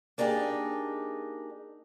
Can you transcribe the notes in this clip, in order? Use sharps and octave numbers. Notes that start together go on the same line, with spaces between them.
A#3 D4 D#4 G4 G#4